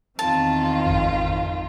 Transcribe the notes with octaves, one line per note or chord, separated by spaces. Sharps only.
E2 D#3 C4 F4 A5
G#1 F2